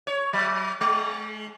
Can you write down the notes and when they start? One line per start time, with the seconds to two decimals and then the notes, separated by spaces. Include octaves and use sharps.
0.07 C#5
0.33 F#3
0.81 G#3